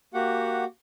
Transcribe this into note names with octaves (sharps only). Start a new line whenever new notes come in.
A#3 F#4 G4 F#5